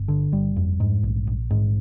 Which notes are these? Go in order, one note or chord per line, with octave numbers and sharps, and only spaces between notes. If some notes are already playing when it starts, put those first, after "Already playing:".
Already playing: G1
D3
G1 G3
F2
G#2
A#1
A#1
G#2